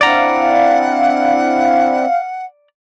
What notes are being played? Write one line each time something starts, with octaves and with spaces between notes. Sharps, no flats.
C4 D4 E4 D5 F5 F#5 A#5